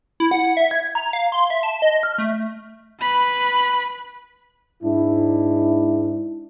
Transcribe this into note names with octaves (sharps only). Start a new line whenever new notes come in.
E4
F#5
E5
G#6
A#5
F5
C6
E5
A5
D#5
F6
A3
B4 B5
G#2 D4 E4